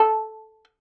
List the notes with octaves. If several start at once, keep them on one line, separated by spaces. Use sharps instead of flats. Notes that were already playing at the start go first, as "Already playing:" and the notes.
Already playing: A4